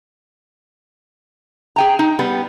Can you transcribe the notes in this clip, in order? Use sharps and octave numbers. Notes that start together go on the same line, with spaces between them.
G#4 G5 A#5
D#4
G3 B3